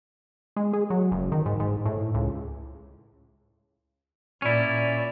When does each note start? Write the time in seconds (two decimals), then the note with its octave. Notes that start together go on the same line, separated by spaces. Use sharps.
0.56 G#3
0.73 G#4
0.90 F#3
1.11 F#1
1.32 D#3
1.46 G#2
1.60 G#2
1.85 A2
2.14 C#2
4.42 A#2 C#4 E4 D5